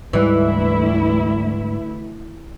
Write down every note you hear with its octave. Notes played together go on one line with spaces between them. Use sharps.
D2 G#2 E3 G3 G#3 E4